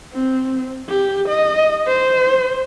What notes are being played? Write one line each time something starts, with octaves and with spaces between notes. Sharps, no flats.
C4
G4
D#5
C5